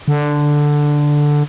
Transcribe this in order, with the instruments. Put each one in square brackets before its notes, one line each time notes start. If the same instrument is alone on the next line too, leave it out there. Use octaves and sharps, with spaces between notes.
[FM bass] D3